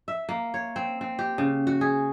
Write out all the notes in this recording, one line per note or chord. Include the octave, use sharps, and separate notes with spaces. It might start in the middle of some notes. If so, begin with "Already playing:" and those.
E5
A#3
C#5
C4
C4
G4
C#3
F#4
G#4